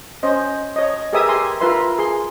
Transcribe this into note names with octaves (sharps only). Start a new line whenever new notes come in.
C#4 C5 D#5
C#5 D#5
G4 G#4 A#4 B4 E5 D#6
G4 E5 G#5 C6
E4 F4 A#4 B4 E5 C6
G#4 C6